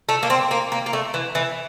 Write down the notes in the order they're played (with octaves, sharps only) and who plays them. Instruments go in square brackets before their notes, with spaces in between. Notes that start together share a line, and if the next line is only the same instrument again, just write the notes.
[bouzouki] A3
A#3
C4
A#3
A#3
A#3
A3
E3
E3